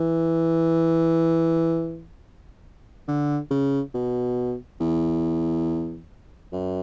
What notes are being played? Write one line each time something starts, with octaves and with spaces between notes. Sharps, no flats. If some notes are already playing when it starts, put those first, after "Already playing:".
Already playing: E3
D3
C#3
B2
E2
F#2